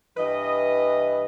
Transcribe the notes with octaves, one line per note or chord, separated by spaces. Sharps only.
G2 E3 B4 D#5